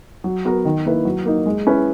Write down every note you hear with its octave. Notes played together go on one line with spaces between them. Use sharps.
F#3
B3 F#4 A#4
D#3
A#3 E4 B4
F#3
A#3 D#4
G#3
C#4 E4 B4